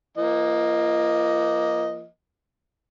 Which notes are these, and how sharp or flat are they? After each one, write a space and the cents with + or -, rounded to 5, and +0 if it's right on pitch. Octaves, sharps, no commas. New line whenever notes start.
F3 -35 A#3 +10 D#5 +0